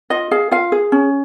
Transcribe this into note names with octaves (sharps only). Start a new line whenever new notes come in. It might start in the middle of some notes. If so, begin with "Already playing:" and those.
F4 D#5
G#4 F5
F4 F5
G#4
C#4